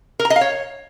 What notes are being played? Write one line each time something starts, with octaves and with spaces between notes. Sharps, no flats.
A#4
A#5
D#5
F5
C#5